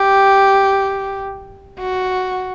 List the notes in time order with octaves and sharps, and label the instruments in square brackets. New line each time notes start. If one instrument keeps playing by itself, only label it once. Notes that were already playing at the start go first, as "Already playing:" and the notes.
Already playing: [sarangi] G4
F#4